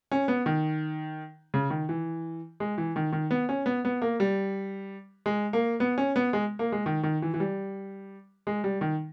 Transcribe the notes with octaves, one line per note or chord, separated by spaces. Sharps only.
C#4
B3
D#3
C#3
D#3
E3
G#3
E3
D#3
D#3
B3
C#4
B3
B3
A#3
G3
G#3
A#3
B3
C#4
B3
G#3
A#3
G#3
D#3
D#3
E3
E3
G3
G#3
G3
D#3